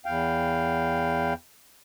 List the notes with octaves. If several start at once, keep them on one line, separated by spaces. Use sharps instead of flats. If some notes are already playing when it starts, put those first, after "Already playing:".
E2 F5 G5